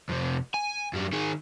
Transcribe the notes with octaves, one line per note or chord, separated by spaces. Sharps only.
F2 C3
G#5
F#2 G3
D#3 G#4